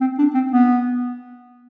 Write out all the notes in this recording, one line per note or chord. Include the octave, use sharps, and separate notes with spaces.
C4
D4
C4
B3